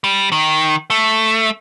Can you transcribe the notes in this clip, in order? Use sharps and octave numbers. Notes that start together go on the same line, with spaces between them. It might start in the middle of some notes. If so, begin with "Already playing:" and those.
G3
D#3
A3